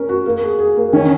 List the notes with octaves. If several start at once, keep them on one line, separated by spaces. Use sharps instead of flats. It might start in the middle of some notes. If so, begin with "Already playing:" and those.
Already playing: C#4 A#4
F#4
A#3
G#4
G#4
A#3
D#3 C#4